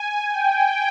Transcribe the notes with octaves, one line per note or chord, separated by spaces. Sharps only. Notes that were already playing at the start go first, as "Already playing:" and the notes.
Already playing: G#5
G5